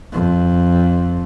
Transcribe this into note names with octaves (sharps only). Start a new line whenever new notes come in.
F2